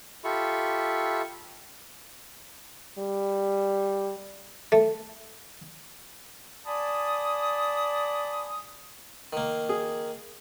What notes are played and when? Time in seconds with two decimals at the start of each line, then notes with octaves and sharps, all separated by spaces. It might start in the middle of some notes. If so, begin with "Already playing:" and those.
0.24 F4 G4 A4 E5 B5 C#6
2.99 G3
4.72 A3
6.66 D5 G#5 A5 B5 D#6
9.33 D#3 A#3
9.69 G#4